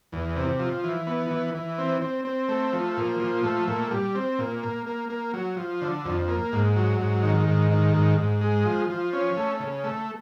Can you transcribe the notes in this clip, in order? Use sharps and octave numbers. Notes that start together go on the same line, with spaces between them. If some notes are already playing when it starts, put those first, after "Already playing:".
E2
C3
F3
E3
B3
E3
E3
C4
C4
C4
A3
F3
A#2
F3
A3
A#2
G3
C4
A#2
A#3
A#3
A#3
F#3
F3
D3
F2
A#3
G#2
F#3
G#2
D#3
G#2
D#3
G#2
G#2
G#3
F3
F3
C#4
A3
C#3
A3